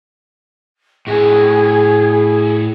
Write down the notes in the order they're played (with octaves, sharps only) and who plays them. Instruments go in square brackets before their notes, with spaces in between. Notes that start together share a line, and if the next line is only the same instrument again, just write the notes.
[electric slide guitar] A2 F#4 [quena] G#4